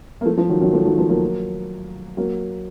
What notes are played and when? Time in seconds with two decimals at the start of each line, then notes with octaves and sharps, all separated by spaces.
0.21 A#3
0.25 F3 A3
0.37 F3
0.49 D#3 F#3
0.61 D#3 F#3
0.73 F3 A3
0.85 D#3 F#3
0.97 F3 A3
1.09 F#3 A#3
2.17 F#3 A#3